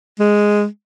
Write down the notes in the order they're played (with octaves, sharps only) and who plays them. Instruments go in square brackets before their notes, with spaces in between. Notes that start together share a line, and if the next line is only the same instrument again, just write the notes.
[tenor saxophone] G#3